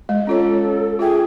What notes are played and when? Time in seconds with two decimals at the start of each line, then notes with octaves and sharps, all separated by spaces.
0.09 G#3 D#5
0.27 C#4 F4 A4 C#5
0.99 F4 G#4 E5 G5